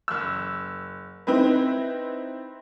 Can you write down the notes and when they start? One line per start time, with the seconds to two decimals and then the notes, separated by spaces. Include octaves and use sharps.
0.08 F#1 E6
1.27 C4 D#4 E4 B4